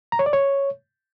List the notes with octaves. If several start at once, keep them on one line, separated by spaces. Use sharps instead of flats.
A#5
C#5
D5
C#5